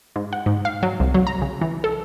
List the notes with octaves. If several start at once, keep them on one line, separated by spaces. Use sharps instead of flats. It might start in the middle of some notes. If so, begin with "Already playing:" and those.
G#2
F#5
G#2
F5
F#3
C2
F#3
A#5
C#3
E3
A4